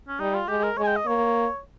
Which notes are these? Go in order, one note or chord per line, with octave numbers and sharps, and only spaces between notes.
C#4
G3 D#4
F4
G#3 G4
A#4
G#3 C#5
G#5
G5
D#5
A#3 C#5